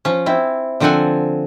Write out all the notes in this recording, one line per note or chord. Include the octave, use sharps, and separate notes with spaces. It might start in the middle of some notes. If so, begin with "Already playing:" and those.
F3 C#4
C4 E4
D3 F3 C4 A4 F#5 G#5